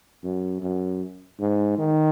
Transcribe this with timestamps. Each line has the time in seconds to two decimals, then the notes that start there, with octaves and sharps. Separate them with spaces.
0.24 F#2
0.62 F#2
1.40 G#2
1.78 D#3